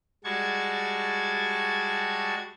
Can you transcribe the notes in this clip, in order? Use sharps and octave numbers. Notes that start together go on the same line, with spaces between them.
G3 G#3 F#4 A5 C#6 G#6